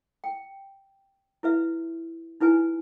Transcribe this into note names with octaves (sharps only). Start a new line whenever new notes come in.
G5
E4 B4 E5
D#4 E4 B4 G#5